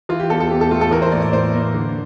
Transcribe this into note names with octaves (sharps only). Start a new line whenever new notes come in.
E3 F4
G4
E2 A4
A4
E2 G4
A4
A3 F4
A4
E3 A#4
C5
A2 D5
D5
A2 C5
A#3
D3